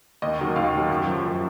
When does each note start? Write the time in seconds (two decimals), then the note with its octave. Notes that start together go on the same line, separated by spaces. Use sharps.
0.22 D#2 D#5
0.39 D#3 F#3
0.56 D#2 F5
0.73 D#3 F#3
0.90 F#2
1.07 F3
1.24 F#2